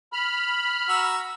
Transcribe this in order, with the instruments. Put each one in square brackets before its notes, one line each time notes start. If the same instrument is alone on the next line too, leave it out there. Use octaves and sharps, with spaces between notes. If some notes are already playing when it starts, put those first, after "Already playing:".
[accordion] B5 F6
[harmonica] F#4 A#5 E6